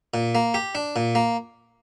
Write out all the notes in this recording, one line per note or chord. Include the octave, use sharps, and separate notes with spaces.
A#2
A#3
G4
D4
A#2
A#3